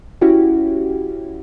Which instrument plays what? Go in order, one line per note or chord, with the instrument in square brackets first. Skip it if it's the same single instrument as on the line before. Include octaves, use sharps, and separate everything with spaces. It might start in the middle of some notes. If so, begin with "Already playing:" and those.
[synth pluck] C#4 E4 F#4 G4